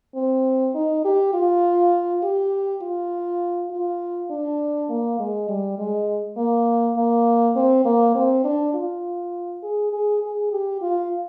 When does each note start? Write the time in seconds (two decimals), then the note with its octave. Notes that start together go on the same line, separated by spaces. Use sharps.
0.15 C4
0.75 D#4
1.05 G4
1.34 F4
2.23 G4
2.82 F4
3.71 F4
4.30 D4
4.89 A#3
5.19 G#3
5.49 G3
5.78 G#3
6.37 A#3
6.97 A#3
7.56 C4
7.85 A#3
8.15 C4
8.44 D4
8.74 F4
9.63 G#4
9.93 G#4
10.23 G#4
10.52 G4
10.81 F4